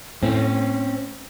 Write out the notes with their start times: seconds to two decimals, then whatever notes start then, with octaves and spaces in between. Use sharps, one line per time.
0.23 A2 C4 C#4